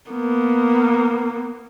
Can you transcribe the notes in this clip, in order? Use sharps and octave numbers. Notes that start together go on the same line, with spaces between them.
A#3 B3